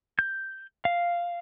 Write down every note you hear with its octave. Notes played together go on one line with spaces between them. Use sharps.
G6
F5